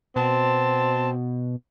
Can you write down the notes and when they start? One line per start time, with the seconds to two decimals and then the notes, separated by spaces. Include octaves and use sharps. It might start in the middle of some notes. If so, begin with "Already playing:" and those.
0.16 B2 C4 A5